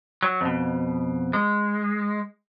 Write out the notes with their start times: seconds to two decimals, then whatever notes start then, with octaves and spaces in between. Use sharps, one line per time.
0.23 F#3
0.41 F2 B2
1.33 G#3